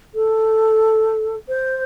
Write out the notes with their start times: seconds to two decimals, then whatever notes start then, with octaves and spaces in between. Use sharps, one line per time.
0.14 A4
1.49 C5